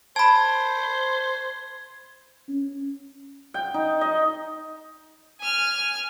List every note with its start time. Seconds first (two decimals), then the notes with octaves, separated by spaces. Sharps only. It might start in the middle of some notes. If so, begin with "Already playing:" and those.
0.16 C5 A5 B5 G#6
2.49 C#4
3.54 G5
3.74 D#4
4.01 D#5
5.41 G#5 F6